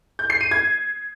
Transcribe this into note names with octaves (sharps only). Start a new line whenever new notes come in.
G6
C7
D#7
G#6